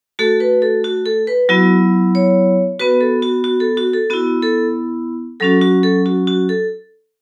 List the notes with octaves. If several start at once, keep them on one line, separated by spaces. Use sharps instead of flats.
A3 F#4 A4
B4
A4
F#4
A4
B4
F#3 B3 E4 F#4
C#5
B3 F#4 B4
A4
F#4
F#4
A4
F#4
A4
B3 E4 F#4
A4
F#3 C#4 F#4 A4
F#4
A4
F#4
F#4
A4